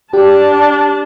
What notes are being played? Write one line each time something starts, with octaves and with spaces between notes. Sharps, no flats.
D4 G4 A5